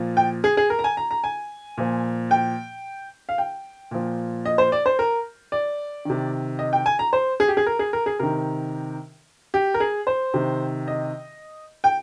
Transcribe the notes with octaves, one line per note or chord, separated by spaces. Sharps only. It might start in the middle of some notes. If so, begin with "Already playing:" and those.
Already playing: A#2 F3
G5
G#4
G#4
A#4
A#5
G#5
A#5
A#5
G#5
A#2 F3
G5
F5
G5
A#2 F3
D#5
C5
D5
C5
A#4
D5
C3 D#3
D#5
G5
G#5
A#5
C5
G#4
G4
G#4
A#4
G#4
A#4
G#4
C3 D#3 A#4
G4
A#4
G#4
C5
C3 D#3
D#5
G5